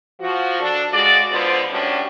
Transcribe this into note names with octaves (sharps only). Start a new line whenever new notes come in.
F3 F#4
D4 A4
C#3 G#3 F#4 D5
G#2 D3 B3 F4 C5
A2 G3 C#4 D4 F#4